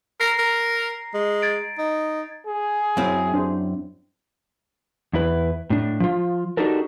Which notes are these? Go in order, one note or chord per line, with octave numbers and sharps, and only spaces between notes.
A#4 A#5 A#6 C7
A#4
G#3
G#6 A6 D7
D#4
G#4
F#2 C4 E4 F5
D4 C5
E2 E4 B4
A2 D4
F3 F4
D4 D#4 F#4 G4 A4 A#4